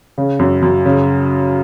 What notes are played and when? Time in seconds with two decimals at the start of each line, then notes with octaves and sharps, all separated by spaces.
0.18 C#3
0.39 F#2
0.62 F#2
0.86 C#3